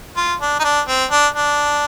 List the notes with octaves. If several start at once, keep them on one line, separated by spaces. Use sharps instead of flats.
F4
D4
D#4
D4
C4
D4
D4